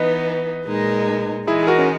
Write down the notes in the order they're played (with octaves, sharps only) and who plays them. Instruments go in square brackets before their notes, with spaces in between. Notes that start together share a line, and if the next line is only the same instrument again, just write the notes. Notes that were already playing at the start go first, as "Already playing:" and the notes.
Already playing: [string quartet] E3 B3 D#4 [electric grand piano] B4 D#5
[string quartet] A#2 G#3 D#4 A#4
[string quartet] E3 G#3 D#4 [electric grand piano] E4 G#4
[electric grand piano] G#4
F#4 A#4
C#4